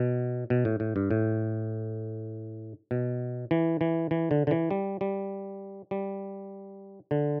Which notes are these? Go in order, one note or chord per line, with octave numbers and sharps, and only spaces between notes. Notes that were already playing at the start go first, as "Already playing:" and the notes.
Already playing: B2
B2
A2
A2
G2
A2
B2
E3
E3
E3
D3
D3
E3
G3
G3
G3
D3